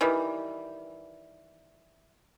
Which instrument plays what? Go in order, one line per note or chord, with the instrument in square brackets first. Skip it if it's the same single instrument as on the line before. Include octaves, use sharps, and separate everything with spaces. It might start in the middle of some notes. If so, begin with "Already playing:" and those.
[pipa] D#3 E3 G3